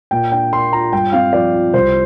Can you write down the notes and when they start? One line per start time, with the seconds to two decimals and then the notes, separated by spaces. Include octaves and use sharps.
0.11 A#2 G5
0.32 D4 G5
0.53 A#3 C6
0.72 F4 A#5
0.93 G2 G5
1.12 C4 F5
1.33 F3 D5
1.54 F4
1.74 C2 C5